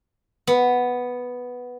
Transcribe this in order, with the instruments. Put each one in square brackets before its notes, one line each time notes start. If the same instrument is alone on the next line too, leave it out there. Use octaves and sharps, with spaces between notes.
[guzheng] B3